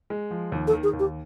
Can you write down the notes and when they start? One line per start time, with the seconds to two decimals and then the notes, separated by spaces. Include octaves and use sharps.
0.10 G#3
0.31 F3
0.52 D#2
0.67 A4
0.73 D#3
0.83 G#4
0.93 D#2
0.99 G4